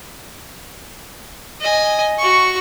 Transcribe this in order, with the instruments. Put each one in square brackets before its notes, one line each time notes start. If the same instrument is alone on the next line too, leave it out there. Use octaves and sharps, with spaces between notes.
[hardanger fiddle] D#5 G#5
F#4 C#6